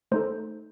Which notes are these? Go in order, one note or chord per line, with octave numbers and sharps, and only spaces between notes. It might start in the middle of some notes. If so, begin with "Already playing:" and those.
A3 D#4 A4 C5